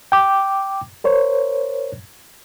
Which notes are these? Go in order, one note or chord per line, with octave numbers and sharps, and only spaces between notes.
G5 D6
A#4 C5 C#5